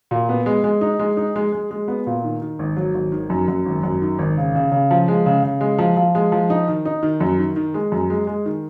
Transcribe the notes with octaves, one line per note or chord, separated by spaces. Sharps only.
A#2
B3
G#3
G#3
D#4
G#3
D#4
G#3
G#3
G#3
B3
A#2
D#3
D#3
G#1
F#3
G#1
D#3
F#2
F#2
G#1
F#2
D#3
G#1
C#3
C#3
C#3
F3
G#3
C#3
C#3
G#3
F3
F3
G#3
F3
D#4
D#3
D#4
D#3
F#2
D#3
D#3
G#3
F#2
G#3
G#3
D#3